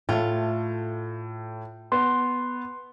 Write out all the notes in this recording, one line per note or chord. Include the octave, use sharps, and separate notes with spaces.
A2 A3 F4
B3 C6